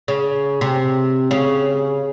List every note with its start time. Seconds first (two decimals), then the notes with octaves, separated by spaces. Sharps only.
0.08 C#3
0.61 C3
1.31 C#3